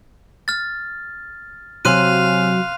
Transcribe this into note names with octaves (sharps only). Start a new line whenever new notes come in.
F6 A6
C3 F#3 C4 F5 G#5 C6 F#6 D#7